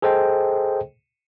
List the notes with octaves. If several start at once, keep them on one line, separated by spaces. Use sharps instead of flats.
G#4 A4 C5 D#5 G5